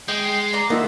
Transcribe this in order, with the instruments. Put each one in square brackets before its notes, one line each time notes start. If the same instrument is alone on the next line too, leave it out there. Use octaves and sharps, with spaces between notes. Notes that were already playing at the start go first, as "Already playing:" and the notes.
[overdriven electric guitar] G#3 [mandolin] D#5 G5
[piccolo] C7
[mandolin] D5 A#5
[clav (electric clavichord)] A#3 D#4 F4 [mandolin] B3 E5